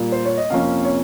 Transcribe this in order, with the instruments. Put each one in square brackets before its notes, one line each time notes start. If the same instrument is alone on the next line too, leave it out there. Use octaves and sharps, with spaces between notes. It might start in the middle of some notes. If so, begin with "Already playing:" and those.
Already playing: [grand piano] A#2 G3 A#3
C5
C#5
D#5
F2 C3 F3 A#3 C#4 F5
C#5